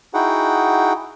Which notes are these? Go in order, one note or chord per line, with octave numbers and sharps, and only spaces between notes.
D#4 E4 F#4 G#4 F#5 G5